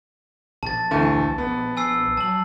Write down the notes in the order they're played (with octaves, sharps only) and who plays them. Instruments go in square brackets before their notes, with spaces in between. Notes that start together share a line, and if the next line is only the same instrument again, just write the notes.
[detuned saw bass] A#1 [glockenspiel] A5 A6
[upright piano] D2 E3 A3
[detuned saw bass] A#1 [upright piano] B3
[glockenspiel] G#5 E6 C7
[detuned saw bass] F#3 [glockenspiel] A5 F#7